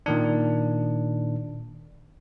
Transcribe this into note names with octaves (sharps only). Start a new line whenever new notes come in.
A#2 D#3 D4